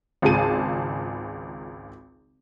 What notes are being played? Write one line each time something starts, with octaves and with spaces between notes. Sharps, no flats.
G#1 C#2 F4 G#4 A5 D#7